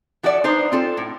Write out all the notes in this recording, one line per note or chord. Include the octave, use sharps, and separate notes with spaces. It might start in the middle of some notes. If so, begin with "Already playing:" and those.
F3 F#4 A4 C#5 D5 E5
D4 D#4 B4 C5
C4 F4 A4
A2